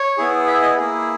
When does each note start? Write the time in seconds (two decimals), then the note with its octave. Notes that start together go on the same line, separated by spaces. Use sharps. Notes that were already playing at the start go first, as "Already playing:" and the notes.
Already playing: C#5
0.17 B3 E4 G#4
0.47 E5
0.62 D#5
0.77 A#3 E4 G#4